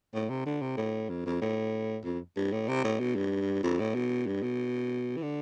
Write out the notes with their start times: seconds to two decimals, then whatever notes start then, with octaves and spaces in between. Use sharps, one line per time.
0.14 A2
0.30 C3
0.46 D3
0.62 C3
0.77 A2
1.09 F2
1.25 F2
1.41 A2
2.04 F2
2.36 G2
2.52 A2
2.68 C3
2.84 A2
2.99 B2
3.16 G2
3.63 F2
3.80 A2
3.95 B2
4.27 G2
4.43 B2
5.17 E3
5.22 D3